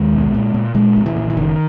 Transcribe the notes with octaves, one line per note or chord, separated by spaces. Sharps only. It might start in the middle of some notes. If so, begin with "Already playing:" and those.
Already playing: D#2 G#3
B1
A#2
A#2
A#2 G#3
A#1
E3
A#2
E3
F#1 D#3